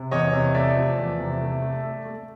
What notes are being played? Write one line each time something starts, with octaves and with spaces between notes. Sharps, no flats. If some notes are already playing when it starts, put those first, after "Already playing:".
Already playing: C3
E2 C#5 D#5
C3
A3 D5 E5
F3
E2
C3
A3
A3
A3
A3